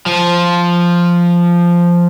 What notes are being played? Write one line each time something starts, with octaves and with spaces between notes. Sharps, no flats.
F3